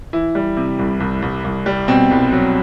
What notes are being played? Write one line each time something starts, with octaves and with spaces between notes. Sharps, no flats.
E3 E4
G3
C3
C2
C2
C2
C2
G3
B2 C4
C2
F#3